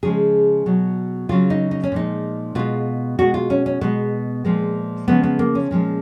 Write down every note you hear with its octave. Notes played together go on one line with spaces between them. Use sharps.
C#3 F3 G#3 G#4
B2 F#3
C#3 F#3 F4
D#4
D#4
C#4
A#2 F3 G#3 D#4
B2 G#3 F4
B2 G#3 F#4
F4
C#4
C#4
B2 G#3 B3
A#2 F3 G#3
C#3 F3 G#3 B3
B3
A#3
C#4
A#2 F3 G#3